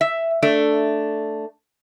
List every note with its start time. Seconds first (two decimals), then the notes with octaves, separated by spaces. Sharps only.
0.01 E5
0.43 A3 D4